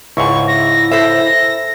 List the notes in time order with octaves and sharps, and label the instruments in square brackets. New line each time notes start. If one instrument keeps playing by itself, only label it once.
[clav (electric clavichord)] C#2 G#2 [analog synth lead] E4 [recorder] C#6
[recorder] A#6
[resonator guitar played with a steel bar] A4 C5 E5 [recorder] A#6